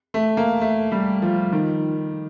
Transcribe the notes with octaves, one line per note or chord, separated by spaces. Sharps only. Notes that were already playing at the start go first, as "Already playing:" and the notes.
A3
A#3
A3
G3
F3
D#3